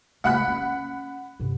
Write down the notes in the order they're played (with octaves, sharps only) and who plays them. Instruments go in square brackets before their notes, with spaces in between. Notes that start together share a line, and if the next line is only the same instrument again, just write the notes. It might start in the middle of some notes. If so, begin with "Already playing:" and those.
[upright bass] C#3 G#3 [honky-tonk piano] F#5 B5 F#6
[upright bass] C#4
G2 C3